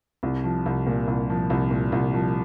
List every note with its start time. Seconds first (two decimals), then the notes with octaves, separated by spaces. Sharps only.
0.23 C2
0.44 F3
0.66 C2
0.87 A#2
1.07 C2
1.30 F3
1.50 C2
1.71 A#2
1.92 C2
2.14 F3